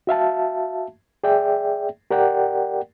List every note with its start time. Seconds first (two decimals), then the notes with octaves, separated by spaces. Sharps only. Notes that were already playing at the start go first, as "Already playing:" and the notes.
0.07 F#4 E5 F5 A5
1.24 G#4 D5 E5 G5
2.11 G4 A#4 D5 F#5 G5